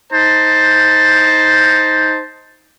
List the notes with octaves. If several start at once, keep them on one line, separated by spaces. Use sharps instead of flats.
D#4 C5 A5